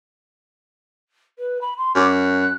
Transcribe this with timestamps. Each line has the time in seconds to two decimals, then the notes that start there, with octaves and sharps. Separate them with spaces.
1.39 B4
1.61 B5
1.77 C6
1.95 F#2 D6
2.10 F#6